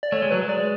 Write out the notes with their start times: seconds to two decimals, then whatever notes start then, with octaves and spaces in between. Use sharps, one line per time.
0.03 D5
0.12 A3 C#5
0.22 G#3
0.31 F#3 B4
0.41 G#3
0.49 D5